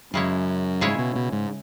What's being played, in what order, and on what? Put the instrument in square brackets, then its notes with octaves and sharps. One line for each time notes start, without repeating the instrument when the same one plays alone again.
[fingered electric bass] F#2 [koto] C#3 G#3 E4 C#5
[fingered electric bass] G#2 [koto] C#3 G#3 E4 C#5
[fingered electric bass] B2
B2
G#2